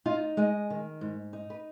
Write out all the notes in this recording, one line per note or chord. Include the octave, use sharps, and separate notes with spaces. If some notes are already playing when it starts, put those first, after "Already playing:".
D#4 F4
G#3 D#5
D#3
G#2
D#4
B4